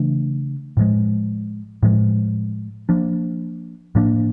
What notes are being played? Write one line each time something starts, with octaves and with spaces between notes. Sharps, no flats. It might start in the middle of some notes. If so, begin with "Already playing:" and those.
Already playing: C#3 E3 A3 D4
A2 F3 G#3
A2 F3 G#3
F3 A#3 D4
A2 F3 A#3 D4